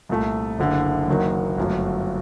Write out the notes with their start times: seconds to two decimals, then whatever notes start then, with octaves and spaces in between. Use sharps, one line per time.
0.09 C2 A#2 A3
0.59 F#1 F#2 D3
1.08 F#1 F#2 D#3 F#3 A#3
1.58 G1 F#2 F#3 A3